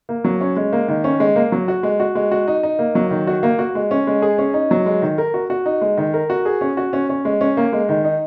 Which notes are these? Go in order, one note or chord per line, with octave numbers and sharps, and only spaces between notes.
A#3
F#3
C#4
G#3
A#3
D#3
C#4
G#3
A#3
F#3
F#4
G#3
F#4
G#3
F#4
D#4
D#4
A#3
F#3
D#3
F#4
A#3
F#4
G#3
C#4
G#3
G#4
C#4
D#4
F#3
G#3
D#3
A#4
F#4
F#4
D#4
G#3
D#3
A#4
F#4
G#4
C#4
F#4
C#4
C#4
G#3
C#4
A#3
G#3
D#3
D#4